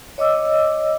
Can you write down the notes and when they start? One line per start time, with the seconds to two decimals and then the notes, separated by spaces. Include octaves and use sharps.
0.18 C#5 D#5 D6 E6